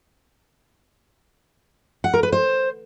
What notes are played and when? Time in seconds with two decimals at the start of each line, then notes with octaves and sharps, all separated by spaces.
2.04 F#5
2.14 A#4
2.23 B4
2.32 C5